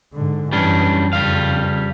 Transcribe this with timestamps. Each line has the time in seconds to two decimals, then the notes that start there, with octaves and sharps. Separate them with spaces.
0.14 G#2 D3
0.52 F#2 E3 G3 C#4 D4
1.13 F2 C#3 G3 F5